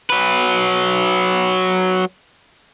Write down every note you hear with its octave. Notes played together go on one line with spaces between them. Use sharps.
F#3 B4